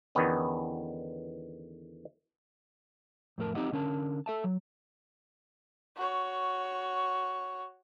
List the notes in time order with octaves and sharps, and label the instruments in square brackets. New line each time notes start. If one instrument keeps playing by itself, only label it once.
[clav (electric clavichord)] E2 D3 D#3 B3 C#4
[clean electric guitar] F2 A2 A#3 A#4 A5
C4 D#4 G4 D#5 F#5
D3 C#4 A#4 A5
A4 E5 A5
F#3
[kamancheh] F#4 C#5